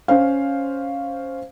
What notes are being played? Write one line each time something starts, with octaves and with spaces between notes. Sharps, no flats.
C#4 C5 F5